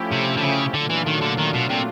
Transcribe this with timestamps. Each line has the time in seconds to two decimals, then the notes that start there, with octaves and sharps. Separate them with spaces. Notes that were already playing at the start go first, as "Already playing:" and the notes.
Already playing: F3 A3 C#4 E4 G4
0.11 C3
0.37 D3
0.42 C#3
0.74 A#2 D3 F#3 A3 D4 F4
0.90 E3
1.06 D#3
1.21 D3
1.38 D#3
1.53 B2
1.69 C3